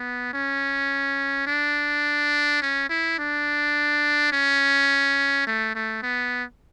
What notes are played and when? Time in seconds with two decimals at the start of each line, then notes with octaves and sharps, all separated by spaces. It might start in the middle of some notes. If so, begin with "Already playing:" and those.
Already playing: B3
0.33 C#4
1.47 D4
2.62 C#4
2.89 E4
3.19 D4
4.32 C#4
5.47 A3
5.75 A3
6.03 B3